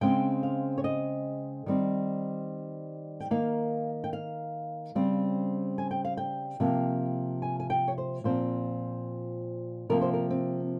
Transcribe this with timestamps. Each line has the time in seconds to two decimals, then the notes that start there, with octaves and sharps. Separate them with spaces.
0.01 C#3 G#3 C4 G5
0.43 F5
0.78 C#5
0.84 D#5
1.66 D#3 G3 C4
3.20 G5
3.30 D#3 A#3 F5
4.04 G5
4.13 F5
4.95 C#3 G3 C4
5.78 G#5
5.91 G5
6.05 F5
6.17 G5
6.60 C3 F3 A#3
7.42 G#5
7.60 G#5
7.70 G5
7.88 C#5
7.98 C5
8.24 A#2 F3 C4 C5
9.89 C3 F3 A#3 A#4
10.01 C5
10.13 A#4
10.30 C4